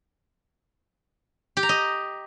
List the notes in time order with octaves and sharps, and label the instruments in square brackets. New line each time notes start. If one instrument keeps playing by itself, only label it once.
[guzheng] G4
A#5
D#5